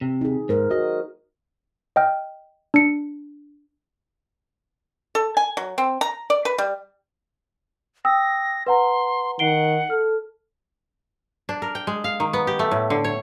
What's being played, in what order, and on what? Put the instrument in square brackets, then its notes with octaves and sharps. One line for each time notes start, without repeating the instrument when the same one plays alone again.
[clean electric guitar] C3
[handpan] D#4 G#4
[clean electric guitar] G#2 [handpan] A#4 C5
[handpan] F#4 [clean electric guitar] D#5
[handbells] D#5 G5 F6
D4 C#7
[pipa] A4
G#5
F#3
C4
A#5
D5
B4
G3
[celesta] G5 D#6 E6 [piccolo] A#6
[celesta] B4 F#5 A#5 [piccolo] C6
[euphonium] D#3 [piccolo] F#5 [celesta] C7 D7 G7
[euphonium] A4 [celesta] F6
[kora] D4
A#4
G5
G#3
F5
D#3
B3
G4
A3
A2
D3
C#5